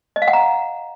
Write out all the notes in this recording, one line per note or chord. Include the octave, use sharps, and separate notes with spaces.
D#5
F5
F#5
A#5